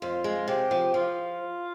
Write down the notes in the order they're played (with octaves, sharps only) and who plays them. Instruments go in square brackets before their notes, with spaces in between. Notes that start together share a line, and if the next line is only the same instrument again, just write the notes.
[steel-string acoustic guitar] F2 [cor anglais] F4
[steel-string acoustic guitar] G#3
[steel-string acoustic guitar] C3 [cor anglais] G4
[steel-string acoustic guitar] F3
[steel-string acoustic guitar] F3 [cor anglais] F4